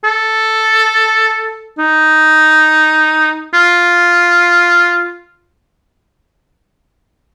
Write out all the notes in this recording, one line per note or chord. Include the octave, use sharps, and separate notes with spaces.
A4
D#4
F4